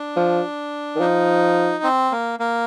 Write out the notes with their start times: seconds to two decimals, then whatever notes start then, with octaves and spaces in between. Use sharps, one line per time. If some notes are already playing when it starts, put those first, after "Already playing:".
Already playing: D4
0.16 F3
0.96 D#3
1.00 F3 D#4
1.84 C4
2.12 A#3
2.40 A#3